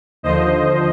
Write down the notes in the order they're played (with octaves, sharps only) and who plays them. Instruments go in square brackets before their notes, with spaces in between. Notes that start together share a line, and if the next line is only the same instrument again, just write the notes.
[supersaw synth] D#2 D3 F3 C5 D#5